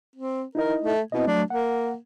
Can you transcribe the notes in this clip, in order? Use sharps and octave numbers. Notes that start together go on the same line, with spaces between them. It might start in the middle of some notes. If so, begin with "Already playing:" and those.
C4
D#4 E4 A#4 D#5
A3
B2 C4 E4 D#5
F#3 A3 D4
A#3 F#5